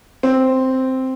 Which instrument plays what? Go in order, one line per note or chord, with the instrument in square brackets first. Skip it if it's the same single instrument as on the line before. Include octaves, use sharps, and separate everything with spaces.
[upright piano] C4